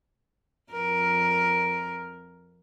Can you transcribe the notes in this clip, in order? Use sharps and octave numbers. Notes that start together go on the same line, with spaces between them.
F2 A#4